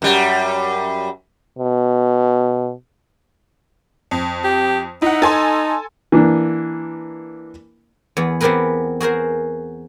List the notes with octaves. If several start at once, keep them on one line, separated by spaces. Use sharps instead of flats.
F#2 G3
B2
F2
G4
D#4 E4 F#5
A4 G#5 C6
E3 A#3 D4
E2 B3 G#4
B3 C4 G4 G#4 A#4 B4
F#4 G#4 A#4 C5